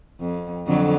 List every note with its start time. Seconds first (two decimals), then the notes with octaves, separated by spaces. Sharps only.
0.20 F2
0.67 F2 D3 F#3